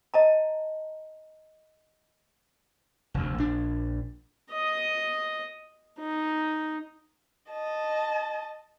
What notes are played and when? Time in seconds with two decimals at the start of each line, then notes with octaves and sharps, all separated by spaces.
0.14 D#5 A5 A#5
3.14 F1 D2
3.38 A#1 D4
4.52 D#5 D#6
5.99 D#4
7.51 D#5 A5